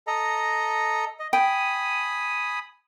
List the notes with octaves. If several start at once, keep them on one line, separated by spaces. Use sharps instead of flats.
A4 D#5 A#5
D#5
G5 G#5 B5 D#6